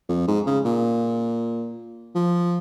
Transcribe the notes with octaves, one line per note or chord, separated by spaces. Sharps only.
F2
G#2
C#3
A#2
F3